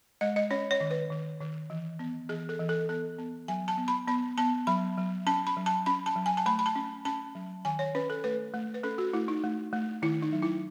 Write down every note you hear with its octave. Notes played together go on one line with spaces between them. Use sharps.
G#3 D#5
D#5
C#4 C#5
C#5
D#3
B4
D#3
D#3
E3
B3
E3 G#4
A4
E3
A4
B3 A4
B3
F#3 G#5
A5
B3
B5
B3 B5
B3 A5
F#3 B5
F#3
C#4 A5
B5
F#3
A5
C#4 B5
A5
F#3
G#5
A5
A3 B5
B5
A5
C#4
C#4 A5
F#3
D#3 G#5
C#5
C#4 B4
A4
A3 B4
A3
B4
C#4 A4
F#4
A3 E4
D#4
A3
A3
D#3 E4
D#4
F#3
E4